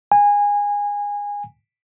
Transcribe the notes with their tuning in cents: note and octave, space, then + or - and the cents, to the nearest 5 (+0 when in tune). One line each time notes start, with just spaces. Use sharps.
G#5 -20